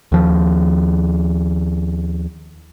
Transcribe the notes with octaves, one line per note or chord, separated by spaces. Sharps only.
D#2 F3